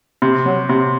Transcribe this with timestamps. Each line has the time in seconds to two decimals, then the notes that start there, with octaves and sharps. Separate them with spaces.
0.22 C3
0.46 F#3
0.69 C3